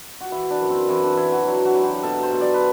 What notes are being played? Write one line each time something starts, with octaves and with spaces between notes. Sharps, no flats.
F#4
E3 E4
D4
F#2
C4
E3 C4
D4
E3 E4
F#4
F#3 D4
F#4
F#3
G4
B2 A4
C5
B2
D5
B4